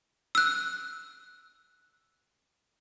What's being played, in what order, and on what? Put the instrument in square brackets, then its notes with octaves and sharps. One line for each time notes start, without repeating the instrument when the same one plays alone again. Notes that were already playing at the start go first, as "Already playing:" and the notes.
[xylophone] E6 F#6